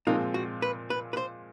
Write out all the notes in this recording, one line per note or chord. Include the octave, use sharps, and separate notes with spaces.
A#2 F3 G#3 C4 D#4 F4
F#4
B4
B4
B4
C5